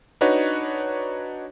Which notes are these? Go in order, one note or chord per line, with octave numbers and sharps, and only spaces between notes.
D4 D#4 F#4 B4 C#5